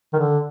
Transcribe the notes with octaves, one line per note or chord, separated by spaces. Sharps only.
D#3
D3